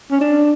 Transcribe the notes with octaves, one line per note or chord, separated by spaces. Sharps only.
C#4
D4